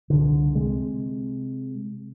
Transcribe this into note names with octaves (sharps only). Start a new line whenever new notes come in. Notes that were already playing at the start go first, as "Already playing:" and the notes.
C2 D3
C3 G#3